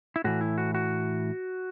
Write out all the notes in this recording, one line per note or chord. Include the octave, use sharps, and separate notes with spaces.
E4
A2 E3 F#4
E4
F#4
F#4